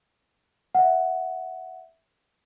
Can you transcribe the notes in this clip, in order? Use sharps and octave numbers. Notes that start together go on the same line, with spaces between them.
E5 F#5